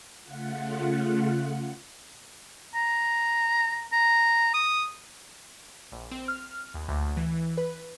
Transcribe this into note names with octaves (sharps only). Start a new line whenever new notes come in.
C#3 A3 F4 F#5
A#5
A#5
D#6
A#1
C4
F6
D#2
D2
E3
B4